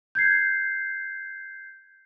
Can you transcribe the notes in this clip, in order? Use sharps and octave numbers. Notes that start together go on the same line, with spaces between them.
G6 G#6 C7